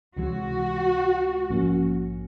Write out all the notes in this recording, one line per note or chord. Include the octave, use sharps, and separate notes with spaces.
C#2 C3 E3 G#3 F#4
A#1 G#2 F3 A#3 C#4